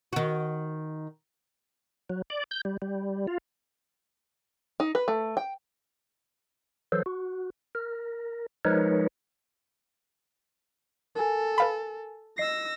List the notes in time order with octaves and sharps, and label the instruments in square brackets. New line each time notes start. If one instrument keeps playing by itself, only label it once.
[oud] D#3 F#4
[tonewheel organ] F#3
D5
G6
G3
G3
F4
[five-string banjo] D#4
B4
A3
G5
[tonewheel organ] E3 F#3 A4 C5
F#4
A#4
F3 G#3 D#4 A#4 B4 C#5
[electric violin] A4 [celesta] A#4 G#5
[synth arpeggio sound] B4 F5 B5
[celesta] D#5 C7 [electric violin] E6 A#6